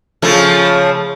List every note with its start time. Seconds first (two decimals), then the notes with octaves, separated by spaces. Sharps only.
0.22 C#3 F3 A3